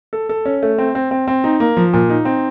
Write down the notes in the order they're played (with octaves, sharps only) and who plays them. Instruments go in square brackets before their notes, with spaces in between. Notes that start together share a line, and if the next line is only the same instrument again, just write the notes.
[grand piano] A4
A4
C#4
A3
C4
C4
C4
C4
D#4
A#3
F3
A#2
D#4
C4